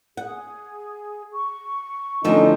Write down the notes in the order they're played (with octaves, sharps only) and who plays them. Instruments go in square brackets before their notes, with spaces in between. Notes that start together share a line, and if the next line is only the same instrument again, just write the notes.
[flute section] G#4 [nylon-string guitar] F#5
[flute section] C#6
[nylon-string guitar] E2 F3 A3 [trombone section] D3 C#4 D#4